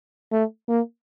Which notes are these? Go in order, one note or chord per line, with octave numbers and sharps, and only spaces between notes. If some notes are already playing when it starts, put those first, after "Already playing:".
A3
A#3